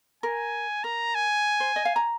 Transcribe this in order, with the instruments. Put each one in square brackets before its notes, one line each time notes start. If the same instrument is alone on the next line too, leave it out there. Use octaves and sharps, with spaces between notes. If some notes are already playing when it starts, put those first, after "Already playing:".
[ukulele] A#4 [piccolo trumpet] G#5
[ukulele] A#4 [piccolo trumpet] A#5
[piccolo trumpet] G#5
[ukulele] C5
D#5
F5
A#5